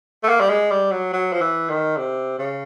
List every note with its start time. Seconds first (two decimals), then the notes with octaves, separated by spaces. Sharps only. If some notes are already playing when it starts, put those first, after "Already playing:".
0.24 A3
0.29 A#3
0.40 G3
0.49 G#3
0.71 G3
0.92 F#3
1.13 F#3
1.33 F3
1.41 E3
1.70 D#3
1.97 C3
2.39 C#3